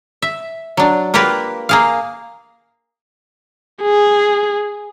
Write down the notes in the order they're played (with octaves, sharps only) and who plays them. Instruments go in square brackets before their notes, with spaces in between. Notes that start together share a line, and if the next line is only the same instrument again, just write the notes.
[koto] E5
F#3 D4
A#3 F4 G4 A#4 B4
A#3 G#4 F5
[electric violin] G#4